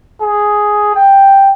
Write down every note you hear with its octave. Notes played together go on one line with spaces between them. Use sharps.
G#4
G5